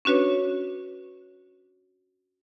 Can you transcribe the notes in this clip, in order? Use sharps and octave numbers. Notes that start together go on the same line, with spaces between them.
C#4 D4 F#4 B4 C#5